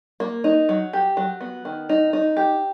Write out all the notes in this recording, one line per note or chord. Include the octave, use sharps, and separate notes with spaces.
A#3
D#4
F#3
G4
F#3
B3
D#3
D#4
D#4
G4